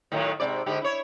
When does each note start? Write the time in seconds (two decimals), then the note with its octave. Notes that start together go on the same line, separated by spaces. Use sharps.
0.12 A2 D#3 F#3
0.40 G#2 C3 D5
0.66 G#2 D3 G4
0.82 E4 C#5